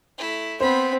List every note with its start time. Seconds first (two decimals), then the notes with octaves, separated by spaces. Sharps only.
0.18 A3 E4
0.60 B3 C4 C5 B5